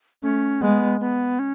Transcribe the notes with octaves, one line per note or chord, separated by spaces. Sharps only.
A3 C#4
G#3 B3
B3
C#4